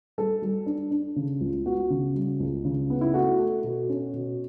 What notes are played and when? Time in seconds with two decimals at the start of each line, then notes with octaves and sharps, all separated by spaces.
0.18 G3 A4
0.42 G3
0.66 D4
0.91 D4
1.16 C#3
1.41 C#2
1.66 B3 F#4
1.90 C#3
2.15 G3
2.40 C#2
2.65 C#3
2.90 B3
3.01 E4
3.14 A3 F#4
3.39 A3
3.64 B2
3.89 C#4
4.14 B2